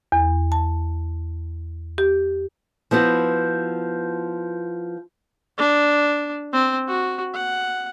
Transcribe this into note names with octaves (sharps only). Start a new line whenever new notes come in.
E2
A5
G4
F3 B3 E4 F#4
D4
C4
F#4
F#5